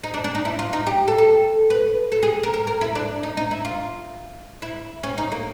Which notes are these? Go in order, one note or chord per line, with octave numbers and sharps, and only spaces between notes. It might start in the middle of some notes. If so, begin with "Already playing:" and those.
D#4
D4
D4
D#4
E4
F4
D#4
G4
A4
A4
B4
A4
G#4
A#4
A#4
A#4
E4
D4
D#4
D#4
E4
F4
E4
C#4
D#4
A#3